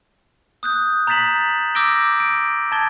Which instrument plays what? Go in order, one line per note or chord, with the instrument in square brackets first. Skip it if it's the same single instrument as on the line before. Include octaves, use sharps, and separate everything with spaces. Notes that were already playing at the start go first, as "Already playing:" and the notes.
[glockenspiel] D#6 F#6 G6
A#5 G6 A6 B6 E7 F#7
D6 E6 G6 A#6 D7 G7
D7
A5 G#6 A6 G7